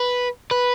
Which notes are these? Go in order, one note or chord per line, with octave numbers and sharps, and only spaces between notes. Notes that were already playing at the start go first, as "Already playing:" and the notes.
Already playing: B4
B4